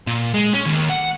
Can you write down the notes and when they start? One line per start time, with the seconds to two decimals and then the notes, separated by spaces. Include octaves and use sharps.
0.07 A#2
0.34 G#3
0.53 C#4
0.66 D#2
0.89 F#5